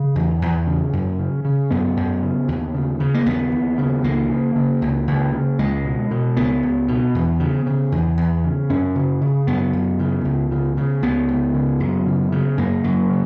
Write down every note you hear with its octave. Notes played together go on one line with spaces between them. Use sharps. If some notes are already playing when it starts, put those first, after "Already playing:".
Already playing: C#3
E2
E2
C#3
F#2
C#3
C#3
F#2 B3
F#2
C#3
D#2
C#3
C#3
A#3
D#2 B3
D#2
C#3
C#2 A#3
C#3
C#3
C#2
C#2
C#3
C#2 G#3
B2
B2
C#2 B3
C#2
B2
E2
C#3
C#3
E2
E2
C#3
F#2 C#4
C#3
C#3
F#2 B3
F#2
C#3
C#2
C#3
C#3
C#2 B3
C#2
C#3
F#2
C#3
C#3
F#2 A#3
F#2
C#3